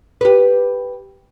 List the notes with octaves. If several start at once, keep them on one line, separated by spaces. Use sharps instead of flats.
G4 B4